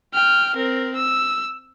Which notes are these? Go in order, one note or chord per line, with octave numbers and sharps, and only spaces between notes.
G5 F6
C4 A#4
E6